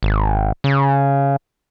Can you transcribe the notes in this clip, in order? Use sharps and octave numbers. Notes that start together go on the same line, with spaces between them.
G#1
C#3